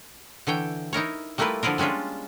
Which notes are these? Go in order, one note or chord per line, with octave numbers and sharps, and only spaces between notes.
D3 E3 C#5 G5
D#4 E4 A#4 C#5
G3 A3 A#3 E4 F4 B4
D3 F3 E4 F4 A#4
G3 G#3 C#4 D4 F4